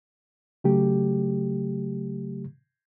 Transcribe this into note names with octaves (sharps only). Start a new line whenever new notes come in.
C#3 F#3 A3 G4